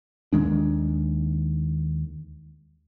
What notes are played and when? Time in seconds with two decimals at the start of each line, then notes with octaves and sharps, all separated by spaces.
0.33 D#2 D#3 G#3 D4